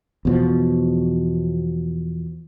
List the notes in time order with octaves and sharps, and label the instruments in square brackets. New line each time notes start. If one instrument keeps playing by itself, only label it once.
[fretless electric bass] E2 B2 F3